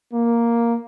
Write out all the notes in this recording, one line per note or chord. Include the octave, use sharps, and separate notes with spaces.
A#3